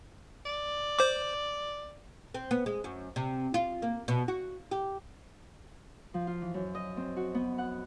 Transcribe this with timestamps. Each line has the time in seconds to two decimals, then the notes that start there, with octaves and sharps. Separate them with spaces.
0.45 D5
0.99 C5 D6
2.34 C4
2.51 B3
2.66 G#3
2.84 F#2
3.16 C3
3.54 F4
3.82 A#3
4.08 B2
4.28 F#4
4.71 G4
6.14 F3
6.27 F4
6.42 E3
6.54 F#2
6.75 D#5
6.97 C4
7.17 F#4
7.35 B3
7.58 F#5